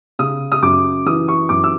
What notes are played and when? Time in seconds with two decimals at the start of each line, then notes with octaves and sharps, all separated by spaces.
0.19 C#3 D#6
0.52 D#6
0.63 F#2 D6
1.06 E3 D#6
1.28 C#6
1.49 F#2 D6
1.64 E6